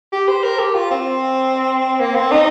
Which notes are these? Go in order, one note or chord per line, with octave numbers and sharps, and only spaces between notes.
G4
C5
A#4
G4
F4
C4
A#3
C4
D#4